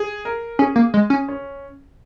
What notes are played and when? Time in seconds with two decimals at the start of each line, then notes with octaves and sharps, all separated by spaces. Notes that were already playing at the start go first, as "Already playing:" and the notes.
Already playing: G#4
0.25 A#4
0.59 C#4 G#4
0.76 A#3
0.94 G#3
1.10 C#4
1.28 C#4